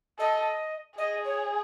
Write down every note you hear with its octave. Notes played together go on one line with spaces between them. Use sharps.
A4 D#5
G#4 D#5
C#5